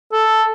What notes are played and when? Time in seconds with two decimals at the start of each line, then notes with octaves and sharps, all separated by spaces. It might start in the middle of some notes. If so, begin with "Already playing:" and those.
0.12 A4